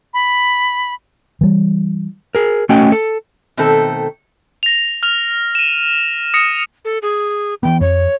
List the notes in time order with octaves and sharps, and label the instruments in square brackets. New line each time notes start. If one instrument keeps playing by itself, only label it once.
[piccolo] B5
[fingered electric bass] E3 G3
[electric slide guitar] G#4 A#4
A3 C#4 F#4 D#5 G5
A4
[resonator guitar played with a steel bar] B2 D#3 A3 C4 A4
[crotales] A#6 F7
F6 F7
D#7 E7
D#6 A#6 C#7
[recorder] A4
G#4
[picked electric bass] E3 B3 [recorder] G5
[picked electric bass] F2 [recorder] C#5